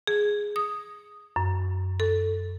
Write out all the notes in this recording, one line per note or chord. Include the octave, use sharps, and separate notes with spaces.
G#4
D#6
F#2
A4